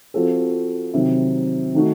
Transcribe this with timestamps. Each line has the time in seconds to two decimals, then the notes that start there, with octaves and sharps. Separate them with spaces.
0.14 F3 C4 F#4 A4
0.94 C3 D#3 F#3
1.74 D#3 A3 D#4 F#4